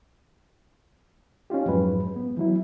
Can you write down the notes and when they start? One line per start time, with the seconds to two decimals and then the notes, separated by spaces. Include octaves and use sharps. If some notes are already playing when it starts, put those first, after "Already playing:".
1.50 C#4 D#4 F4 G4
1.66 F2 G#2 F#3 G#3 B4
2.16 B3
2.37 E3 F#3 E4